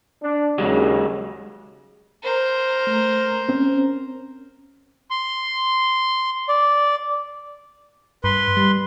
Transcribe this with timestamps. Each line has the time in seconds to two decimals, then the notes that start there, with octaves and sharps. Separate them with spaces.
0.23 D4
0.58 D#2 C#3 F#3 G#3 F#4
2.23 A#4 C5
2.87 A3
3.49 C4 C#4
5.10 C6
6.49 D5
8.24 G2 B4 C6
8.57 G3